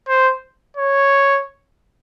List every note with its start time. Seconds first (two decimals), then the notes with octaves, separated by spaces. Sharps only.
0.08 C5
0.77 C#5